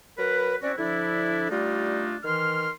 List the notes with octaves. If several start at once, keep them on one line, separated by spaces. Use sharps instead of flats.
F#3 A#4 B4
C4 C#4 E4 F#4 D5
D3 F3 D4 E4
G3 A3 D4 D#4 F4
D#3 E3 C6 F6